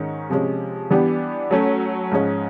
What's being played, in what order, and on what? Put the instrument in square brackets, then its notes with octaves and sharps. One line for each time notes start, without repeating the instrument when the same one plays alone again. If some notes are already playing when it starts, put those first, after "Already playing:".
Already playing: [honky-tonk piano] G#2 D#3 G#3 C#4
C3 F3 G#3 C#4
E3 G3 B3 D4 G4
F#3 A3 C#4
G#2 F3 G#3 C#4